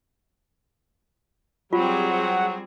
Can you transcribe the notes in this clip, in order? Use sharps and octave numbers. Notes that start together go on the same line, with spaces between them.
F#3 G3 C4 F4 G4 G#4
F#5